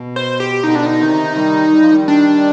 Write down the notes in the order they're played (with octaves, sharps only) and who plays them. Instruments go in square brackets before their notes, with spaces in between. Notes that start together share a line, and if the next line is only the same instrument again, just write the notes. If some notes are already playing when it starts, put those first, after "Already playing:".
Already playing: [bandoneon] B2
[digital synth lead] C5
G4
[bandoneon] B2 D3 [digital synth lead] D#4
[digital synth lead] D4
D#4
[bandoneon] C3 D#3
D#3 G3
G3
F3
D#3 G3
[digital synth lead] D4